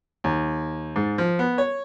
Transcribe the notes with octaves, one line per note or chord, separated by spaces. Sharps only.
D#2
G#2
F3
B3
C#5